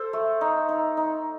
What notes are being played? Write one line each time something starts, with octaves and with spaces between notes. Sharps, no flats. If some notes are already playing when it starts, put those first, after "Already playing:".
Already playing: A4 C5
A3
D#4
D#4
D#4